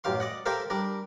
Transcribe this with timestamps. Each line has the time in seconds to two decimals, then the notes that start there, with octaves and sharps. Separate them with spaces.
0.04 A1 F#2 G4 F5 C6
0.20 D5 D#5 F#5
0.46 G4 A4 A#4 C5 E5 F5
0.70 G3 D4 A#4